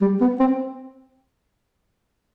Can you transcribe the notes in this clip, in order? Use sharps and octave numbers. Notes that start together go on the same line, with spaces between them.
G3
B3
C4